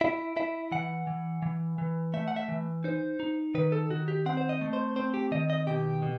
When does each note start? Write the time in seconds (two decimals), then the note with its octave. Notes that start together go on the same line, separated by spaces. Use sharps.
0.01 E4 E5
0.37 E4 E5
0.71 E3 F#5
1.07 E3
1.42 E3
1.78 E3
2.14 A3 E5
2.28 F#5
2.36 E5
2.49 E3
2.84 D#4 C5
3.20 D#4
3.55 D#3 B4
3.72 A4
3.90 D#3 F#4
4.08 G4
4.26 C4 F#5
4.37 C5
4.49 D#5
4.61 A3
4.73 C5
4.96 C4 C5
5.14 G4
5.32 D#3 D#5
5.50 D#5
5.67 B2 G4
6.02 B2